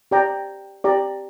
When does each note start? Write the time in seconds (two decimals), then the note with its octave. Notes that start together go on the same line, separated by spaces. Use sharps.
0.11 G4 D5 G5 A#5
0.84 G4 D5 G5 A#5